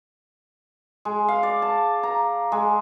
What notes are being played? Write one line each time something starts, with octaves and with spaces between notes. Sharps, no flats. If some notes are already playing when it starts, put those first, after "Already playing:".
G#3
F5
D5
A5
A#5
G#3